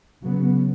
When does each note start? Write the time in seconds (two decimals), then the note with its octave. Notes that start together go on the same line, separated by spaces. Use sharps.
0.23 C#3 F#3 B3